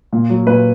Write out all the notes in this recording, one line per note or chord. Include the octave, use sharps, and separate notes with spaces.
A#2
F#3
A#2 B4